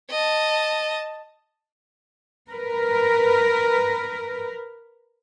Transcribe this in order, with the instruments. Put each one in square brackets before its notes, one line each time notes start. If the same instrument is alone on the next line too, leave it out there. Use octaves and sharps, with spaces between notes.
[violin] D#5 A5
[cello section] A#4 B4